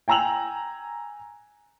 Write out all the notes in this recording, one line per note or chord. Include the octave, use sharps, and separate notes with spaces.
G5 G#5 A#5 E6 F7 F#7